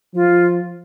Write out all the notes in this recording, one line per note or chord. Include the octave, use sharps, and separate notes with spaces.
F3 F4